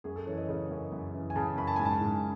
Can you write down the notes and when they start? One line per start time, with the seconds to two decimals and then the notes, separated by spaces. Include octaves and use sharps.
0.04 F#2 G#4
0.16 A4
0.26 E3 C#5
0.37 D#5
0.49 C#3 D#5
0.71 F#2
0.92 F#2
1.14 E3
1.30 G#5
1.36 C#3 A5
1.57 F#2 B5
1.67 A5
1.76 G#2 G#5
1.85 A5
2.01 G#2